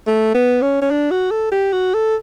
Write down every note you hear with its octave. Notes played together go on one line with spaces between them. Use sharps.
A3
B3
C#4
C#4
D4
F#4
A4
G4
F#4
A4